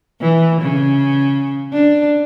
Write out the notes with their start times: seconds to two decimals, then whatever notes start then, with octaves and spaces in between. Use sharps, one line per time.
0.21 E3
0.62 C#3
1.73 D4